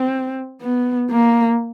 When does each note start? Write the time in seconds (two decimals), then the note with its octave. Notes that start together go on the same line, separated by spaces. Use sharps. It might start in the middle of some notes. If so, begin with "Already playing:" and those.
Already playing: C4
0.61 B3
1.10 A#3